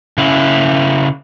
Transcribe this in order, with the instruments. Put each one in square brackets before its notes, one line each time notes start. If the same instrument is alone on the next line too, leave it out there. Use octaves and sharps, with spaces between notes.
[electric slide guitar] C#3 E4